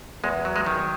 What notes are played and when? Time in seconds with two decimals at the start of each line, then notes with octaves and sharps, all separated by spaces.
0.24 E2 G#3
0.45 F#3
0.56 G#3
0.66 D#3